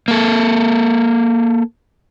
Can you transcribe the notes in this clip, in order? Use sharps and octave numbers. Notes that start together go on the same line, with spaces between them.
A#3 A4